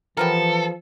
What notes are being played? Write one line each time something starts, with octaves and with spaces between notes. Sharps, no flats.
E3 F3 G3 B3 A4 A#4